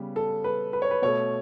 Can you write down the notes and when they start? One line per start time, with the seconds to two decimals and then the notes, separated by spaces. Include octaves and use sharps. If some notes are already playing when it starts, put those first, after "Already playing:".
Already playing: C#3 G3 B3
0.16 A4
0.44 B4
0.73 B4
0.82 C#5
0.91 B4
1.02 B2 A3 C#5